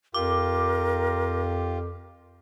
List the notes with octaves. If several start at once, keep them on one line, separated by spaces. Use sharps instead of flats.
F2 F4 G4 A#4 D6